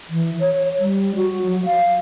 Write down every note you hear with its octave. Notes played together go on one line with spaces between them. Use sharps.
E3
C#5
G3
F#4
F#3
F5